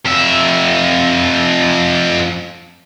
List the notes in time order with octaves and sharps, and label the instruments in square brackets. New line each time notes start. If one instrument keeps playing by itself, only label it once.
[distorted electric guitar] F2 E5